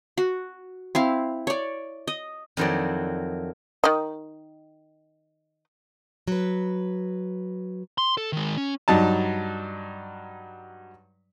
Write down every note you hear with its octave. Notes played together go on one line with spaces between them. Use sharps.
F#4
C4 E4 F5
C#5 D5
D#5
F2 D#3 F#3 E4 D5
D#3 D#5
F#3 B4
C6
A4
D#3 G#3
C#4
G2 F#3 D#4 A5